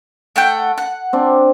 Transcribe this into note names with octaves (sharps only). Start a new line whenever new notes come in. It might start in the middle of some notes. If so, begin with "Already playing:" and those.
A3 F#5 G5
F#5
C4 D4 D5